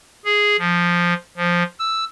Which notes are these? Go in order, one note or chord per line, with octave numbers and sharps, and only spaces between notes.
G#4
F3
F3
E6